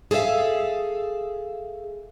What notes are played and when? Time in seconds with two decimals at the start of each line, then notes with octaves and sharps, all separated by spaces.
0.11 G#4 A4 C5 E5 F5